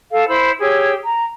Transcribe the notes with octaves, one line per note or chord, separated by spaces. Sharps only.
A4 F5
E4 C5 B5 E6
G4 G#4 C#5 E6
A#5